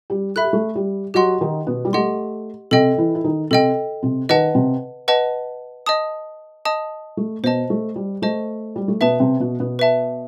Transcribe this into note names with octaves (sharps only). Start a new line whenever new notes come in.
G3 G4
A4 E5 B5 F#6
G4
A3 A4
G3 G4
F#3 F#4 G4 D#5 F#5 C6
D#3 D#4
B2 B3
G3
A3 G4 D#5 F#5 C6
C3 C4 A4 D#5 G5
E3 E4
E4
D#3 D#4
C3 C4 A4 D#5 G5
C3 C4
D#3 D#4 B4 D#5 F#5 A5
C3 C4
B4 D#5 F#5 A5
D#5 A5 D#6
D#5 A5 D#6
A3
B2 B3 C5 D#5 A5
A3
G3
A3 C5 D#5 A5
G3
A3
B2 B3 B4 E5 A5
C3 C4
B2 B3
B2 B3
B4 E5 A5